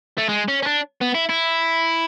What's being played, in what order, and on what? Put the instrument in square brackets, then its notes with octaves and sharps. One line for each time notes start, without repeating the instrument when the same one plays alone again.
[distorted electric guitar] A3
G#3
C#4
C#4
D4
B3
E4
E4